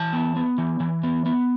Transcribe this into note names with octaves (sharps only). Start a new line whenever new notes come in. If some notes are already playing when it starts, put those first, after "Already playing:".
Already playing: E3 A5
B3
B3
E3
E3
B3
B3